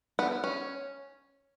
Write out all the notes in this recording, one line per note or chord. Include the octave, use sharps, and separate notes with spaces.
B3
C#4